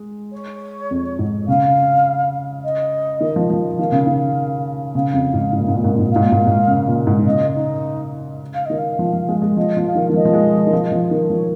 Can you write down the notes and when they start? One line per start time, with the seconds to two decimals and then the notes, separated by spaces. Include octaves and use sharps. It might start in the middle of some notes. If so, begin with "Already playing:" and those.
Already playing: G#3
0.32 C#5
0.91 F2
1.19 G#2
1.48 C#3 F5
2.64 D#5
3.21 D#3
3.36 F3
3.50 F3
3.79 D#3 F5
3.92 C#3
4.07 D#3
4.95 C#3 F5
5.14 F2
5.33 G#2
5.53 G#2
5.60 A#2
5.68 G#2
5.76 A#2
5.84 G#2
5.92 A#2
6.00 G#2
6.08 A#2 F5
6.16 G#2
6.23 A#2
6.32 G#2
6.38 A#2
6.47 G#2
6.68 C#3
6.88 A#2
7.07 G#2
7.19 D#3
7.26 C#3 D#5
7.54 D#4
8.54 F5
8.65 D#3 D#5
8.78 F5
8.99 F3
9.13 F3
9.29 G#3
9.42 G#3
9.57 F3 D#5
9.77 F3
9.86 F5
9.95 D#3
10.10 D#3
10.14 F3 D#5
10.25 F3
10.33 G#3
10.67 D#3
10.73 F3
10.92 F3
11.11 D#3
11.30 F3 C#5